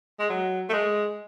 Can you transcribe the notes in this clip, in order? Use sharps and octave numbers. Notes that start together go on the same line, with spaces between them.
G#3
F#3
A3
G#3